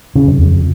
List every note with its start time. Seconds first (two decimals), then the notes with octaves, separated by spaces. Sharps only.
0.15 C#3
0.27 F#2
0.39 F2